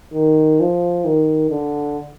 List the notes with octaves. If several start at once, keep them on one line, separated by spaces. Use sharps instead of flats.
D#3
F3
D#3
D3